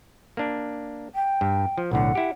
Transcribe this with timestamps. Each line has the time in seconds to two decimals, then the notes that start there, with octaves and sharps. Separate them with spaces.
0.37 A#3 D4
1.15 G5
1.41 G2
1.78 F3
1.91 B1 A2 D3 F#5
2.15 E4 G4